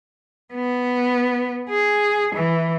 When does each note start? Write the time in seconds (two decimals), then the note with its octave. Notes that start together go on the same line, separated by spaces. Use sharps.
0.54 B3
1.69 G#4
2.35 E3